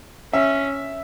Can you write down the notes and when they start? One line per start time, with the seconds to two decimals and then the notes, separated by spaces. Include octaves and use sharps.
0.33 C#4 E5